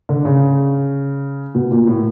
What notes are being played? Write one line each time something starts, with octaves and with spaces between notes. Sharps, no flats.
D3
C#3
B2
A#2
A2